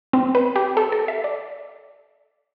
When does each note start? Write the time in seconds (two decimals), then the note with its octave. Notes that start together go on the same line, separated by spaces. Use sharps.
0.13 C4
0.35 B4
0.56 G4
0.77 A4
0.92 A4
1.08 E5
1.24 D5